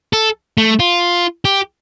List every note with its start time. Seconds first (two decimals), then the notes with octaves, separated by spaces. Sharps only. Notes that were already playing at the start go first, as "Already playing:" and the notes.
0.13 A4
0.58 A3
0.79 F4
1.45 G4